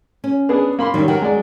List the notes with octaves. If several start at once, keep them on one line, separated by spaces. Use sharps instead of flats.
C#4
B3 D4 G#4
A#3 B5 C6
D#3 F#3 G3 G4
F#3 A#4 F#5 G5
G#3 D5